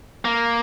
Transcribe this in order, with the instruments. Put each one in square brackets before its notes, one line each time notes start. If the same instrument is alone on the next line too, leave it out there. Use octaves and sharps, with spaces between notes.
[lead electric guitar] A#3